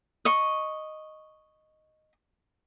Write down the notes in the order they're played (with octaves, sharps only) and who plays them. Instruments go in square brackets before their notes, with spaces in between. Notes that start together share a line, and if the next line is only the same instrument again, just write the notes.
[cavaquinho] D#5 C#6